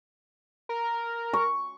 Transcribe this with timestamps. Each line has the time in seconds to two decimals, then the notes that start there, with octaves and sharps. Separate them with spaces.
0.69 A#4
1.33 C#6